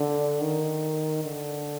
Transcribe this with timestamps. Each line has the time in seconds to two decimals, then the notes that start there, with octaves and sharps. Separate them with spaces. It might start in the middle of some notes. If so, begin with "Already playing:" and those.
Already playing: D3
0.41 D#3
1.23 D3